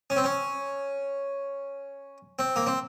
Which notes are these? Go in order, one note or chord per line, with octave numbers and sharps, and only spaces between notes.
C#4
C4
C#4
C4
A#3
C4